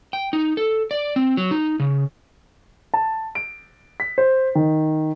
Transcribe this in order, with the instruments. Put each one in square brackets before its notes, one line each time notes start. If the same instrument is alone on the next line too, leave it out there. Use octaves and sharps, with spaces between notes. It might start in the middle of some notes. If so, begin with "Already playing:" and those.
[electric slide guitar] G5
D#4
A4
D5
C4
F#3
D#4
C#3
[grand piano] A5
D7
B6
C5
D#3